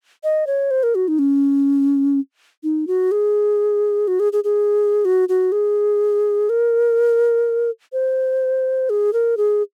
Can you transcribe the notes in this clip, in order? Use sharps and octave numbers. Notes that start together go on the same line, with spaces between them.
D#5
C#5
C5
A#4
F#4
D#4
C#4
D#4
F#4
G#4
F#4
G#4
G#4
G#4
F#4
F#4
G#4
A#4
C5
G#4
A#4
G#4